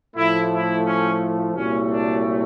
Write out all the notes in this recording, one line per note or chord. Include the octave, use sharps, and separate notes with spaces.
A2 F3 A3 E4
E4
C#4
C2 A#2 F#3 A3 C#4
D4